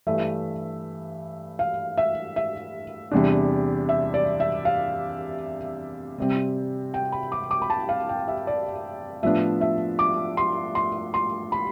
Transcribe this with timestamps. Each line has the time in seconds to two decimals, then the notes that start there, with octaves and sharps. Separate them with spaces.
0.07 G2 E3 A3 E5
1.59 F5
1.98 E5
2.36 E5
3.11 E2 C3 G3 D4
3.89 E5
4.14 D5
4.40 E5
4.65 F5
6.18 C3 G3 C4
6.94 G5
7.12 B5
7.32 D6
7.51 D6
7.62 B5
7.70 A5
7.89 F5
8.09 G5
8.28 E5
8.47 D5
9.23 A2 F3 B3 D4 E5
9.61 E5
9.99 D6
10.37 C6
10.75 C6
11.14 C6
11.52 B5